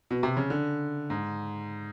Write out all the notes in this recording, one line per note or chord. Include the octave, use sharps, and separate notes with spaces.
B2
C3
C#3
D3
G#2